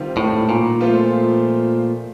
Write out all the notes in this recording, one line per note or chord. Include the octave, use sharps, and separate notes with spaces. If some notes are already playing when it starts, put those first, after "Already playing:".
Already playing: C3 D#3 G3 C4 F4
A2
A#2
F3 A3 C4 F4 C5